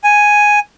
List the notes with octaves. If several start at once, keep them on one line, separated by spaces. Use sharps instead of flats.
G#5